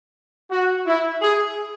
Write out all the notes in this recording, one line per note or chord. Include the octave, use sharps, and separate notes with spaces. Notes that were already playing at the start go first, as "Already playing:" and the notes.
F#4
E4
G#4